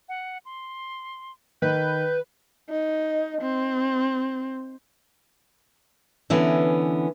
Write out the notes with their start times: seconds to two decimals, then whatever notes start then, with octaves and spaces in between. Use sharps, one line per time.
0.09 F#5
0.45 C6
1.62 D#3 B4 G6
2.69 D#4
3.42 C4
6.30 D3 E3 B3 C#4